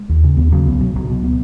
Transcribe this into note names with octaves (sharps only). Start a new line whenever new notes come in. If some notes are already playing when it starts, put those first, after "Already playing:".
Already playing: G#3
D#2
C#3
D#2 B3
C#3 F#3
C#2 B3
B2 F#3
C#2 F#3
B2
B3